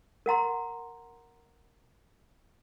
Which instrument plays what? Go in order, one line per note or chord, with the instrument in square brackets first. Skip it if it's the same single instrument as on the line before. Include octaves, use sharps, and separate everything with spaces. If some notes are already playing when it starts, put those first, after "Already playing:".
[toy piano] A#4 F#5 A#5 C6